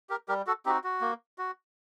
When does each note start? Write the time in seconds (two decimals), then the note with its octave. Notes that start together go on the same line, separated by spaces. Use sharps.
0.10 G4 A#4
0.28 G3 G4 A#4
0.47 F#4 A4
0.66 C4 D#4 F#4 G4
0.84 F#4
1.01 A#3
1.38 F#4